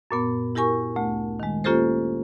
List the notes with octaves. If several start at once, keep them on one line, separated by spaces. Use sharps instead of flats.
F#2 A#2 B3
E4 G4 A#4 G#5 C#6
D2 A3
D#3 G#3
A#3 C#4 F4 G4 A4 C5